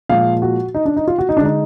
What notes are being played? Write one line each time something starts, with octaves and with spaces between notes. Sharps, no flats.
A#2 F3 G#3 F5
F#4
D#4
D4
D#4
F4
F#4
D#4
D4
D3 G#3 D#4